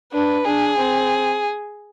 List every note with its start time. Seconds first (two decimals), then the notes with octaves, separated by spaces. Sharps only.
0.13 D4 B4
0.45 D4 G#4
0.77 C4